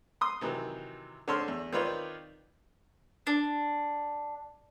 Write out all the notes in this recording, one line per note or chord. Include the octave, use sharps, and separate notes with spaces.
C6 D#6
C3 D#3 E3 F#3
D3 C4 C#5 A5 C6 F6
E2
D#3 C4 F4 B4 C#5 D5
D4